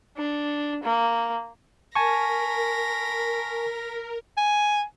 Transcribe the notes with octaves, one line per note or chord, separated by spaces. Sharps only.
D4
A#3
A#4 G#5 A5 B5 C#6 A#6
G#5